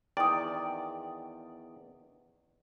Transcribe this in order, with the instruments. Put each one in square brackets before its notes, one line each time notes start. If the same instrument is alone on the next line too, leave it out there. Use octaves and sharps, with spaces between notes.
[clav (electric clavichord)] E2 D#3 D5 [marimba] G5 D#6